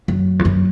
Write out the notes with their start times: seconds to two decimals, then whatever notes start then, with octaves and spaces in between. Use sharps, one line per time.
0.08 F#2
0.39 E2
0.45 F#2